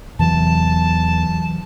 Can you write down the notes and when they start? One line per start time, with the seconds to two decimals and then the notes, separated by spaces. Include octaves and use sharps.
0.19 E2 C3 E3 F#3 A5